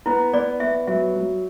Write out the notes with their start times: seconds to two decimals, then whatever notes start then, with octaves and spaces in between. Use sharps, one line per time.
0.06 B3 E4
0.33 B3 D5
0.60 B3 E5
0.87 F#3 E5
1.15 F#3